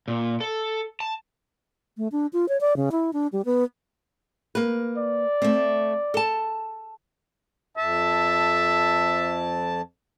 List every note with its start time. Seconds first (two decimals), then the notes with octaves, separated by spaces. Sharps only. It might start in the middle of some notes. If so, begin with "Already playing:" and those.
0.08 A#2
0.41 A4
1.00 A5
1.97 A3
2.12 D4
2.33 F4
2.49 C#5
2.61 D5
2.76 C#3
2.92 E4
3.13 D4
3.32 G3
3.45 B3
4.55 A#3 B4
4.98 D5
5.42 A3 C4
6.14 A4 A5
7.77 F2 E5 A5